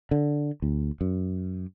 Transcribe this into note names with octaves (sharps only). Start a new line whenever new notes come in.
D3
D2
F#2